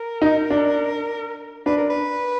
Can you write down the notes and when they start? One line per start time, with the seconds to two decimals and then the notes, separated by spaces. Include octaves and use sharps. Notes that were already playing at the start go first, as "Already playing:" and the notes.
Already playing: A#4
0.22 D#4
0.51 D4
1.66 D4 B4
1.77 A#4
1.90 B4